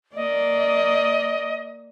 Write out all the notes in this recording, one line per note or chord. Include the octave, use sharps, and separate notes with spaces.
A#3 D5 D#5